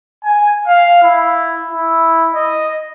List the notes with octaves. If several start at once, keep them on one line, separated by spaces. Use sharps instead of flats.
G#5
F5
E4
E4
D#5